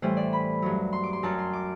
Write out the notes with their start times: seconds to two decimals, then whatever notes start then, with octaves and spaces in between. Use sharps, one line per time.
0.02 A2 E3 G3 C5
0.17 D5
0.33 B5
0.62 G2 F#3
0.93 C6
1.04 D6
1.13 C6
1.23 F#2 F#3 A5
1.39 C6
1.53 D6